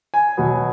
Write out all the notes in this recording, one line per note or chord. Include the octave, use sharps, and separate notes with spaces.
G#5
B2 F#3 B3